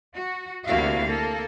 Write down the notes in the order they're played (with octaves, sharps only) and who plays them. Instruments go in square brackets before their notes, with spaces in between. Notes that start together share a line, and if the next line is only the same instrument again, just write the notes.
[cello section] F#4
D2 C3 A#3 E4 F#4 F5
A#3 A4